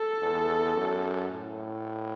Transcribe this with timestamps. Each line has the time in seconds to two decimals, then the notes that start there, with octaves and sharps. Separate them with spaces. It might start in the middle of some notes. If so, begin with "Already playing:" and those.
Already playing: A4
0.22 E2
0.76 F#2
1.31 A2